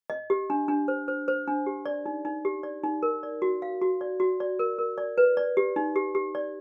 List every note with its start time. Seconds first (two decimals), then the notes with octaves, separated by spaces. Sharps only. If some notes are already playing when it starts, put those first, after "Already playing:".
0.10 D#5
0.30 G4
0.50 D4
0.68 D4
0.88 C5
1.08 C5
1.28 C5
1.47 D4
1.66 G4
1.86 D5
2.06 D#4
2.25 D#4
2.45 G4
2.63 D5
2.84 D#4
3.03 A#4
3.23 D5
3.42 F#4
3.62 F5
3.82 F#4
4.01 D5
4.20 F#4
4.40 D5
4.59 A#4
4.78 A#4
4.98 D5
5.18 B4
5.37 D5
5.57 G4
5.76 D#4
5.96 G4
6.15 G4
6.35 D5